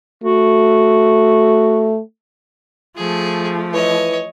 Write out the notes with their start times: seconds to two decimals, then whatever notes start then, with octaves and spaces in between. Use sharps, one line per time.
0.23 A3 F#4
2.97 F3 A3 G#4
3.73 E3 C#5 D#5